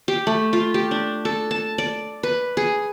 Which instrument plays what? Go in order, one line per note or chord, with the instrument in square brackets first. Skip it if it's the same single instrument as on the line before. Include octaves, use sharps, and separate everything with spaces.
[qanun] G4
A3
F4
G4
D4
A4
A5
D5
B4
G#4